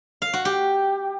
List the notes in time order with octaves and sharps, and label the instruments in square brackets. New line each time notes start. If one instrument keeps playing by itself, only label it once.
[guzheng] F5
F#4
G4